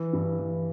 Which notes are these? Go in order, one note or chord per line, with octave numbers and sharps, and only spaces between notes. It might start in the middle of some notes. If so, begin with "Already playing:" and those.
Already playing: E3
G2
E3